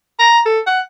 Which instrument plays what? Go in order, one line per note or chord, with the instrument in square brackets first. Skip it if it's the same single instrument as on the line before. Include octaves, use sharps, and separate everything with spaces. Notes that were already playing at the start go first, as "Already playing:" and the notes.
[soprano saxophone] A#5
A4
F#5